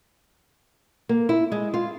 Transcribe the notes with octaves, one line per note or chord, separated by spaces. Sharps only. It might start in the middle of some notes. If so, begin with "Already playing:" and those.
A#3
E4
G#3
F4